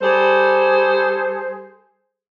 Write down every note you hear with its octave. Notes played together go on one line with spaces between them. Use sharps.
G3 G#4 A4 C5